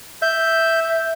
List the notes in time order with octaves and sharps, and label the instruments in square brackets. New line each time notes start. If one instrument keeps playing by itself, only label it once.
[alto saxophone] E5 [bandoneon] G6